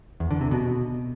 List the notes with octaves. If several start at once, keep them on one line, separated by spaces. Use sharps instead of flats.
E2
D3
C3
B2